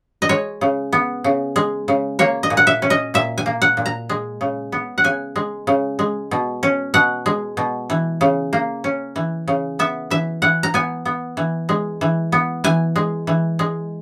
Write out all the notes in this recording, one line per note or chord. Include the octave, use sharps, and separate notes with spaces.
D#5
G#3 C#5
C#3
B3
C#3
G#3
C#3
A#3 C#5
D#5
A#2
F#5
E5
C#4
D#5
A#2 E5
G#5
A#3
F#5
A#2
A#5
G#3
C#3
B3
F#5
C#3 G#5
G#3
C#3
G#3
B2
C#4
B2 F#5
G#3
B2
E3
C#3
A#3
C#4
E3
C#3
B3 E5
E3 E5
E3 F#5
A#5
B3 G#5
B3
E3
G#3
E3
B3
E3 G#5
G#3
E3
G#3